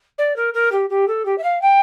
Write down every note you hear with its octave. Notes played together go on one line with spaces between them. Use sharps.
D5
A#4
A#4
G4
G4
A4
G4
E5
F5
G5